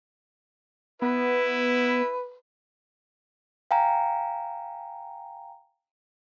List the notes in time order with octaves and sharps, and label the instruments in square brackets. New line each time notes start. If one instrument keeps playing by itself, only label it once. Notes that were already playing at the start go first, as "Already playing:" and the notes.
[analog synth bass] B3 [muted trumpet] E4 [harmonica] B4
[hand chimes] F5 G5 G#5 A#5